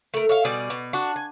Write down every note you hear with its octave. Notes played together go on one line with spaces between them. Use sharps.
A3 A#4
C#5 E5 F5
B2 G3 G#4 D5
B2
D4 F#4
G#5